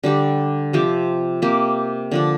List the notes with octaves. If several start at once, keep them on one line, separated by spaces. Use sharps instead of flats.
D3 G3 D4 G4
C3 F3 C4 G4
C3 A#3 G4
D3 F3 D4